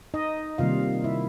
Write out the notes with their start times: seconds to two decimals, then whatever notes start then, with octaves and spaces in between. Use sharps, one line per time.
0.14 D#4 D#5
0.58 C3 D#3 G3 A#3 F4 F5
1.04 E4 E5